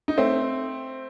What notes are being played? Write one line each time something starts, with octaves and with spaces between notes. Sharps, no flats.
D#4
A3 C4